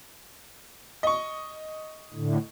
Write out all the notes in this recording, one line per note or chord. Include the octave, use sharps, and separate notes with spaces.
D#5 C#6
A2 D3